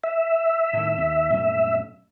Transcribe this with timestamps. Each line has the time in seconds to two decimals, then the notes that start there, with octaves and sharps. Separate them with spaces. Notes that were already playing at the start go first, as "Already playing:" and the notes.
0.04 E5
0.73 A2 D#3
0.98 D#2
1.32 F#2 A#2 A3